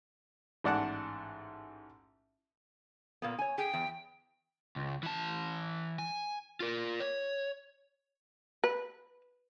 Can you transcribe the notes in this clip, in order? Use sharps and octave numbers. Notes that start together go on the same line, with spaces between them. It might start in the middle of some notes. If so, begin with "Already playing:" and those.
A1 G#2 D5 F#5 A5 F#6
A#2 A#3 B3
C#5 G#5
G#4 G5
E2
C#2
E3 A5
G#5
F4 A#4
C#5
B4